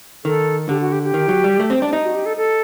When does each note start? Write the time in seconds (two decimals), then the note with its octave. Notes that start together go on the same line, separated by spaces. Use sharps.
0.25 D#3 A4
0.69 D3 G4
0.81 F#4
0.92 G4
1.03 G4
1.14 D#3
1.29 F#3
1.44 G3
1.60 A3
1.70 C4
1.82 D4
1.93 D#4
2.04 F#4
2.15 G4
2.26 A4
2.37 A4